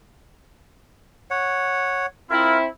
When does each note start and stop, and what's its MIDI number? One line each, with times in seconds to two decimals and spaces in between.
1.30 2.06 73
1.30 2.06 78
2.31 2.66 60
2.31 2.66 64
2.31 2.58 65
2.31 2.58 70